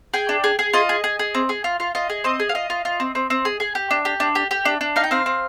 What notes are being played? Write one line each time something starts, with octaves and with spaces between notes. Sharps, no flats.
G#4 G5
D4
G#4
G#4
F4 D#5
G#4
G#4
G#4
C4
G#4
F4
F4
F4 D#5
G#4
C4 D#5
G#4
F5
F4 D#5
F4
F4
C4
C4
C4
G#4
G#4
G4
D4
G4
D4
G4
G4
D4
D4
D#4 F5
G5
C4 F5
C4